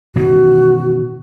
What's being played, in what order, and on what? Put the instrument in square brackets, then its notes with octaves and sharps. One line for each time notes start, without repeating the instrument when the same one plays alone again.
[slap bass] B2 D#3 E3 [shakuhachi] F#4